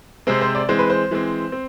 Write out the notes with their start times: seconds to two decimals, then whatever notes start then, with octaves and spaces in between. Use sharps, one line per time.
0.27 C3 G#3 C4 C5
0.41 C5
0.55 D5
0.69 E3 G#3 C4 C5
0.79 B4
0.90 C5
1.11 E3 G#3 C4
1.52 C4